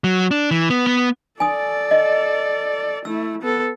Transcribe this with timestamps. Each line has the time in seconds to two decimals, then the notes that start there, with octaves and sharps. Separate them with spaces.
0.04 F#3
0.31 D4
0.51 E3
0.70 B3
0.87 B3
1.40 A4 D5 G#5 D#6
1.91 D#5
3.05 A3 E4 E6
3.42 B3 A4